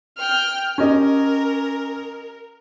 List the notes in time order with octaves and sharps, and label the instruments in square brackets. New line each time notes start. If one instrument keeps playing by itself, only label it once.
[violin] G5 F6
[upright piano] C#4 G4 D#5 [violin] A#4